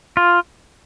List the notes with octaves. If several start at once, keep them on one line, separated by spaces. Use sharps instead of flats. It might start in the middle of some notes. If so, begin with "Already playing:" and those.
F4